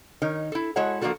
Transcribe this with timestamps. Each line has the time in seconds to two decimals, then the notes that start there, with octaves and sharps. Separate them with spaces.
0.22 D#3 D#4 A#4 C#5
0.52 E4 A4
0.76 G#3 E4 F#4 A4 C#5 F#5
1.01 F3 A#3 B3 D4 F#4 A4